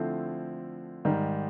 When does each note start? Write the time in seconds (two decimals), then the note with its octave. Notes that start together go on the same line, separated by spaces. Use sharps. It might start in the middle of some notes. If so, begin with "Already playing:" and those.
Already playing: D3 F3 A3 C4 E4
1.05 G#2 D#3 G3